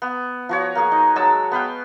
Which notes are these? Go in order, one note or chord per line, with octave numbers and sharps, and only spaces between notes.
B3
F3 F#4 C#5
A#3 G#4
D#4
F#3 G#3 A5 E6
B3 B4 F5 G5